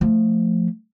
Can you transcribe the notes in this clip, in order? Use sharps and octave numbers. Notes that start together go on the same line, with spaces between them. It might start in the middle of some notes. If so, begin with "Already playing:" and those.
F3 A3